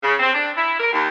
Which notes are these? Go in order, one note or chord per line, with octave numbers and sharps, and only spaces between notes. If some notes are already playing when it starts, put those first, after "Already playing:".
C#3
C4
D4
E4
A#4
D#2